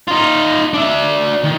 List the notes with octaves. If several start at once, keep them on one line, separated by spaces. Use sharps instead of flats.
D#4 F4
D4 E5
D#3